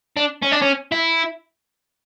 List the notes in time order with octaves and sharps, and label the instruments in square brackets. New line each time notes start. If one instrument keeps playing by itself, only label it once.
[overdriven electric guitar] D4
C#4
D4
C#4
E4